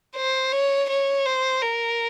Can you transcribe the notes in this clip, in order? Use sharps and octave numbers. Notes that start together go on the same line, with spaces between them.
C5
C#5
C#5
C5
A#4